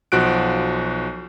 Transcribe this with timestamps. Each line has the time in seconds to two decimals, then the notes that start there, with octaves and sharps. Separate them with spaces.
0.12 B1 F3 F#4 F#6 D7